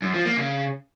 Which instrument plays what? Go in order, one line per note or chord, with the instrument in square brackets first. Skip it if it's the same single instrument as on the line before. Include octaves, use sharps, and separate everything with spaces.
[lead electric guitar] F#2
F3
A#3
C#3